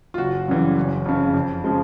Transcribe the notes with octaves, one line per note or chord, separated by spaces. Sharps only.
F4
F#1 F#4
F#2 C#3 E3 G3
F#1
F2 C#3
F2
C#3 F3 G#3